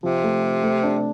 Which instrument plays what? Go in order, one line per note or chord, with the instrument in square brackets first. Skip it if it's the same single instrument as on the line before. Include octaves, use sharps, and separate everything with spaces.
[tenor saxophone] C3 [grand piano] F3
[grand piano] A3
C4
A3
D4